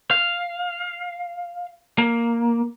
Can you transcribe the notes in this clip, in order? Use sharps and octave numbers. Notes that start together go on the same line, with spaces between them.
F5
A#3